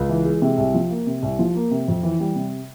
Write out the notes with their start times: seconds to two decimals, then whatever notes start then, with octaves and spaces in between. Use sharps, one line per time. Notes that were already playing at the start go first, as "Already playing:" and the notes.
Already playing: C#2
0.09 E3
0.25 G#3
0.42 C3
0.58 C2
0.74 F3
0.90 A#3
1.07 C3
1.23 C2
1.39 F3
1.55 A#3
1.71 C3
1.88 F2
2.03 E3
2.20 G3
2.35 C3